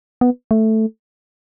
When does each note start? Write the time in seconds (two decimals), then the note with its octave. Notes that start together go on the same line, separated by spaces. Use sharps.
0.21 B3
0.51 A3